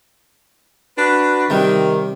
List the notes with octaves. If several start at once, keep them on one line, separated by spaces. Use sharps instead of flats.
D4 F#4 B4
C3 D#3 G3